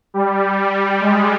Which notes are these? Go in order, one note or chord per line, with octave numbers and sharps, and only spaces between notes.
G3
G3
G#3